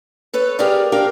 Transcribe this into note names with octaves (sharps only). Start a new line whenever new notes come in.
A4 B4 C#5
G4 G#4 A#4 B4 D5 F5
C4 D4 G4 A#4 F5